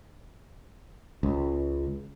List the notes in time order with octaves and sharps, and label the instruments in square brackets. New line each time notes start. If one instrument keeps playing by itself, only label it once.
[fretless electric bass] C#2